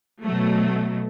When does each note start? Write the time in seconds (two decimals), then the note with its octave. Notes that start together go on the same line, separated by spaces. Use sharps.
0.22 B2 F#3 A3